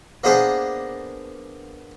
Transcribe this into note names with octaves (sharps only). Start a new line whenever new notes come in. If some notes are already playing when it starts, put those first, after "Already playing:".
A#3 B3 D4 G#4 C5 D#5